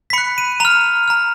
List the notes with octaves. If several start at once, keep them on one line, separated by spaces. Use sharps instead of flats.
B6
B5 F#6 C#7
D#7
A#5 F6 F7
A#5 F6